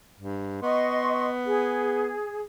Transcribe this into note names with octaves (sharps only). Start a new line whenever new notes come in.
G2
B3 D#5 C6 C#6
G#4